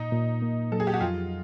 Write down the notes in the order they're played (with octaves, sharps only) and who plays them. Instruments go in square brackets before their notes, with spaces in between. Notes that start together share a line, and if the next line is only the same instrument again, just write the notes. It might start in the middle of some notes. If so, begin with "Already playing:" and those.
Already playing: [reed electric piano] A#2 [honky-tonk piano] D#4
[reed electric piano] A#2
A#3
[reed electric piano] F#3 [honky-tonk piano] A4
[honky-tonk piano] G#4
G4
F#4
[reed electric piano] F2 [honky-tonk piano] F4